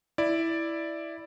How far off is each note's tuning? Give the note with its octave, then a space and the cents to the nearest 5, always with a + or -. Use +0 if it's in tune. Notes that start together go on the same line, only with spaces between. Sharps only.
E4 +0 D5 +0